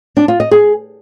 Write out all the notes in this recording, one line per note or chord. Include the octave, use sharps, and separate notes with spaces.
D4
F4
D#5
G#4